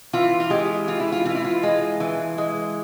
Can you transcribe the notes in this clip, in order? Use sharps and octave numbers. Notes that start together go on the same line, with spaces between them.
E3 F4
F4
G#3 G4
E3 F4
E4
F4
E3 F4
E4
F4
G#3
E3
G#3